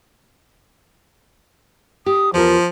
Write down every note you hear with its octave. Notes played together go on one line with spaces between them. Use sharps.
G4 D#6
E2 F3 F4 A#4